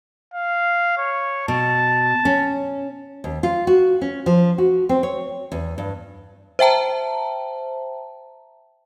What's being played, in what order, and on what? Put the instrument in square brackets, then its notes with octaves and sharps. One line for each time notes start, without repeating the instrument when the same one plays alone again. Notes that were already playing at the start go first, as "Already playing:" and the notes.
[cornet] F5
C#5
[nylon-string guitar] B2 [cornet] A5
[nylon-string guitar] C#4
D#2
F4
F#4
C#4
F3
F#4
C4
C#5
E2
G2
[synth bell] C5 E5 G5 A5 A#5